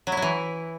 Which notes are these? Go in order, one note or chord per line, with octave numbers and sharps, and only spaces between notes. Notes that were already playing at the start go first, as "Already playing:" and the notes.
F#3
E4
F#3
E3